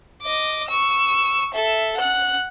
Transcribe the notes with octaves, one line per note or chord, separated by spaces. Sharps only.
D#5 D6
C#6 E6
A4 E5
F#5 F#6